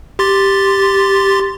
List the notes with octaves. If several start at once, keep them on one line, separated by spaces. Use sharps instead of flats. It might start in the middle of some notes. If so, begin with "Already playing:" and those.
G4 C6 A6